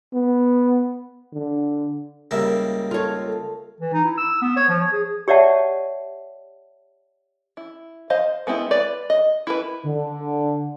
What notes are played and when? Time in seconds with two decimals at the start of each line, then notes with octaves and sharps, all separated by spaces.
0.14 B3
1.33 D3
2.31 C#2 G3 A#3 A#4 E5
2.91 F4 A4 C#5
3.27 A4
3.81 E3
3.93 D#4
4.05 E4
4.18 E6
4.42 B3
4.56 C#5
4.69 F3
4.80 C#5
4.92 G#4
5.28 G4 C#5 D5 E5 F#5 A5
7.57 E4
8.10 C5 D#5 F5
8.47 G#3 B3 C4 E4
8.71 B4 D5
9.10 D#5
9.47 E4 A#4 B4
9.85 D3